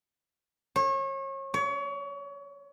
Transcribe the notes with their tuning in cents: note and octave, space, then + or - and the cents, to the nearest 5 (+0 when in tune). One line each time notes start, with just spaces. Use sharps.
C#5 -35
C#5 +30